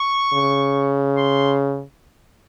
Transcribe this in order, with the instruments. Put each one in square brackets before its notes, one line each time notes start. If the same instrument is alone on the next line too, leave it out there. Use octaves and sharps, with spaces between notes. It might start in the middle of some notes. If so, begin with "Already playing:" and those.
Already playing: [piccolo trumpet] C#6
[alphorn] C#3
[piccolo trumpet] C6